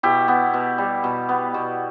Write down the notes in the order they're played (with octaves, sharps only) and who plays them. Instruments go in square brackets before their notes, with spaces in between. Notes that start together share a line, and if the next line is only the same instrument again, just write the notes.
[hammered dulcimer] B2 E4 G4
B3
B2
G3
B2
B3
B2